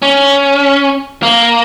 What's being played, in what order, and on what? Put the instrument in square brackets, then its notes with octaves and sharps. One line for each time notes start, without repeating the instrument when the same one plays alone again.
[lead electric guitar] C#4
A#3